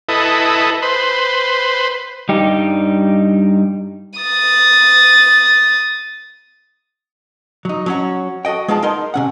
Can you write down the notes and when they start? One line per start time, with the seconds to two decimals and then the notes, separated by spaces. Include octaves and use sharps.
0.09 E4 A4 B4 D#5
0.82 B4 C5
2.29 G2 G3 D#4 G4
4.20 D#6 A6
7.65 F#3 D#4
7.86 F#3 C#4 F#4
8.45 F#4 A4 D#5 G5
8.68 G#3 B3 D#4 F4 A5
8.82 D#4 A#4 D#5 C6
9.14 C3 C#4 F#5